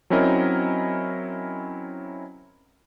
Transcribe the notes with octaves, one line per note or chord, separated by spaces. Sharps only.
F#3 C4 C#4 E4 A#4 D#5